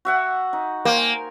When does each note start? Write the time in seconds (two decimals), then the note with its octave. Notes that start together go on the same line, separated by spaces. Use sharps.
0.05 F#4 E5 F#5
0.53 D#4
0.85 A#3 C5 G5
0.97 G#5